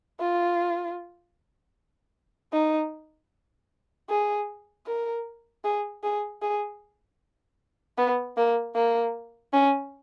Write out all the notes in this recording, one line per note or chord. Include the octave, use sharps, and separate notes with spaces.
F4
D#4
G#4
A#4
G#4
G#4
G#4
B3
A#3
A#3
C#4